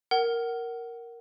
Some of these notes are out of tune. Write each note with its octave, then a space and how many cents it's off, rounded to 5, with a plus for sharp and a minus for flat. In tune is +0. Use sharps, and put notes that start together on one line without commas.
A#4 +0 F#5 +25